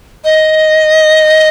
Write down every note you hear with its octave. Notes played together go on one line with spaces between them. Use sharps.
D#5